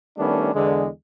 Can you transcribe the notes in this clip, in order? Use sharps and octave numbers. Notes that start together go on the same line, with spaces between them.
D#3 G3 A3 B3 C#4 D4
E2 D3 G#3